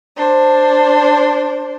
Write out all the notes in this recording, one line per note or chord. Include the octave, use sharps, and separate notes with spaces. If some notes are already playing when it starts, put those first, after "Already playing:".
D4 C5